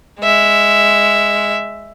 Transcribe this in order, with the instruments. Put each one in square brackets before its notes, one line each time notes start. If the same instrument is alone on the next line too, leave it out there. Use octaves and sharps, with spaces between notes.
[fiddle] G#3 E5